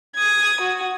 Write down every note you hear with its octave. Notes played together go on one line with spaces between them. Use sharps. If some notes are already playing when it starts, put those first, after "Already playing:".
D#6 G#6
F#4